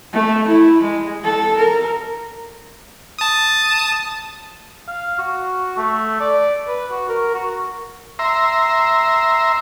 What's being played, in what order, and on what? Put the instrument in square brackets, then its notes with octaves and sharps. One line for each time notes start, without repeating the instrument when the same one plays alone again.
[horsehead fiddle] A3
E4
G#3
A4
A#4
[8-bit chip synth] A5 D#6
[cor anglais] F5
F#4
A3
D5
B4
F#4
A#4
F#4
[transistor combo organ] E5 A#5 C6